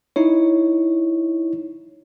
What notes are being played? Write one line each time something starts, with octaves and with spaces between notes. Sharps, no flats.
D#4 E4 C#5